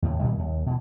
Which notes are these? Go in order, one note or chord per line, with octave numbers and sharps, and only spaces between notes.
D#2 A2 C#3
A#2 D#3 G3 A3
D#2
B2 E3